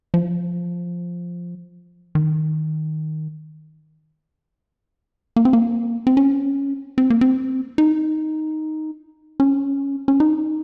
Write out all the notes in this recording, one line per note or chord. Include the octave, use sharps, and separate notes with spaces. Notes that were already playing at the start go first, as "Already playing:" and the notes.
F3
D#3
A#3
C4
A#3
C4
C#4
C4
A#3
C4
D#4
C#4
C#4
D#4